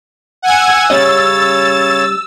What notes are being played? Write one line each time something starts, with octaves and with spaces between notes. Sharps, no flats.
F#5 G#5 E6 G#6
C#3 G3 C#4 C#5 D#5 A6